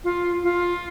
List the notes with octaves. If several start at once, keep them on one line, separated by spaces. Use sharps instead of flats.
F4
F4